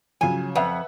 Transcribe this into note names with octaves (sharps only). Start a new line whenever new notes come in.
C#3 F3 F#3 G#5
F2 B4 E5 F#5